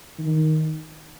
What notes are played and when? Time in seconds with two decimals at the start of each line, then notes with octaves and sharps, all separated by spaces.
0.19 D#3